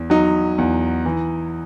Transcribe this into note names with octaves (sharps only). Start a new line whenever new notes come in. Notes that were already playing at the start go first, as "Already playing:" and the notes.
Already playing: E2
F#3 D#4
E2
E3